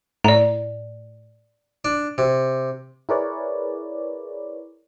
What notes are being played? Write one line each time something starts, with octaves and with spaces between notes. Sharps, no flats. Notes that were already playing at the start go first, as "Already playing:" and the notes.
A2 D5 A#5
D4
C3
E4 G#4 A#4 B4 C#5 D5